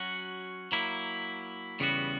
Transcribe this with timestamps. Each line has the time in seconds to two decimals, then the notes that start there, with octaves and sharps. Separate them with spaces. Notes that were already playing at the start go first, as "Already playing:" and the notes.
Already playing: F#3 C#4 F#4
0.72 F#3 A#3 E4
1.80 E2 C#3 G3 B3 F#4